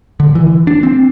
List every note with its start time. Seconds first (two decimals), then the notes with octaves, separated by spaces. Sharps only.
0.20 D3
0.35 E3
0.67 D4
0.83 C4